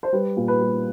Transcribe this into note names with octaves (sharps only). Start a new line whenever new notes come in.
C5
G3 B4
A#2
B4
G3